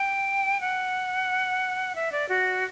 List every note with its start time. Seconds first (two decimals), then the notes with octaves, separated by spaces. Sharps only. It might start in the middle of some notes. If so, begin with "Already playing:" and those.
Already playing: G5
0.60 F#5
1.95 E5
2.12 D5
2.29 F#4